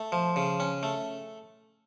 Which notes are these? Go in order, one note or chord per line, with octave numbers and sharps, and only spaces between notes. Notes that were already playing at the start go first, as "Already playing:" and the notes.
Already playing: A3
F3
C#3
C#4
A3